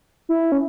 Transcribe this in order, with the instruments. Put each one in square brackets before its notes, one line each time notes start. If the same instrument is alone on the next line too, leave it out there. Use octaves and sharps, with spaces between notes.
[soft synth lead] E4
C#4